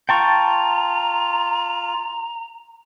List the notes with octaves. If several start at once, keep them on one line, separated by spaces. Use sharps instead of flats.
F4 G5 A5 A#5 C#6